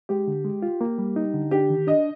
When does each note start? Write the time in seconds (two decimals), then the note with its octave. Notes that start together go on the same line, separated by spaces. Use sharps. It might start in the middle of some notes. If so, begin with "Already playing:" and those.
0.09 G#3 G4
0.27 D3
0.44 G#3
0.62 F4
0.81 A#3
0.98 G3
1.16 D#4
1.34 D3
1.51 D4 G4
1.70 D#3
1.87 D4 D#5